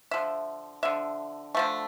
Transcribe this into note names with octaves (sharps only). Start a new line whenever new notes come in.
D3 F3 E5
D3 F3 E5
D3 F3 A3